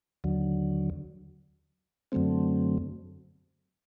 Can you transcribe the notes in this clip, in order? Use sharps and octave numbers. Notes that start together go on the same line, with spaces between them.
D#2 D3 F#3
F#2 D3 F#3 A3 C4